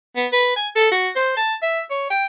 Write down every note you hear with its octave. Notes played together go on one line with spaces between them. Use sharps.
B3
B4
G#5
A4
F#4
C5
A5
E5
C#5
G5